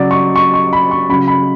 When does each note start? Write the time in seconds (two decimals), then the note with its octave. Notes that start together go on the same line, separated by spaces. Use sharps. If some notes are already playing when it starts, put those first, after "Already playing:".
Already playing: C#3 F#3 D5
0.11 C#6
0.36 C#6
0.54 C#6
0.73 B5
0.91 C#6
1.09 C#3 F#3 B5
1.28 B5